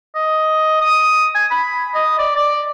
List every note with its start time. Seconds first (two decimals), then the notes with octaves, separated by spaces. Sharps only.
0.15 D#5
0.81 D#6
1.35 G#5
1.51 B5
1.95 D#5
2.19 D5
2.36 D5